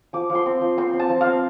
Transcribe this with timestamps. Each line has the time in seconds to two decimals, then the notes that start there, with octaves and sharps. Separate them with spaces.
0.13 F3 D6
0.30 F3
0.35 C6
0.46 C4
0.61 F3
0.77 C4 C6
0.93 C4
0.99 A5
1.09 F3
1.21 F5
1.26 C4